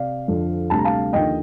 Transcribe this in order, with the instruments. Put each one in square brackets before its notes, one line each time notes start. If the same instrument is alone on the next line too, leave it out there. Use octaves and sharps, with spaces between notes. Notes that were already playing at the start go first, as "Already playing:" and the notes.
Already playing: [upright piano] C3 D5 F5
F2 D3 F3
D2 C3 G3 A5
A#5
F5 A5
D#2 D3 F3 D#5 G5